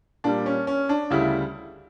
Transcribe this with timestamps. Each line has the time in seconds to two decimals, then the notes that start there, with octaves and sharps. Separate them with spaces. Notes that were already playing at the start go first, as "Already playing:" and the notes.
0.24 A#2 G3 D4
0.46 C#4
0.67 C#4
0.89 D4
1.10 D2 C#3 G3 E4